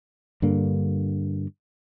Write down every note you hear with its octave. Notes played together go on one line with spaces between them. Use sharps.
G2 D3 A#3